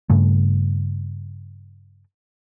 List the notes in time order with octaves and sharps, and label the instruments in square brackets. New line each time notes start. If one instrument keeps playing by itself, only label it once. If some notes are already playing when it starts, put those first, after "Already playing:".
[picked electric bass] G2 C#3 A3